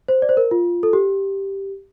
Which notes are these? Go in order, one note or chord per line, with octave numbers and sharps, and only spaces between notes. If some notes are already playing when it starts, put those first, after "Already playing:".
C5
D5
C5
A#4
F4
A4
G4